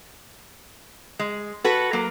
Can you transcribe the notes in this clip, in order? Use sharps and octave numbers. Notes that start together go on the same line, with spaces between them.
G#3
F#4 A4 B4
F#3 A#3